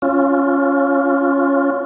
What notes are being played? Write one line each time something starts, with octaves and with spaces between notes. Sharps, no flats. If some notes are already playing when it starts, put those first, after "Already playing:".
C#4 F4